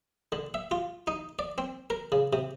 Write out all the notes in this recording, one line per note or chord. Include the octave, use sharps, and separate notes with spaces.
D3
E5
F4
D#4
D5
C4
A#4
C#3
C3